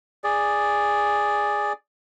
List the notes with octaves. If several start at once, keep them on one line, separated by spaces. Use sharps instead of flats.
G#4 D5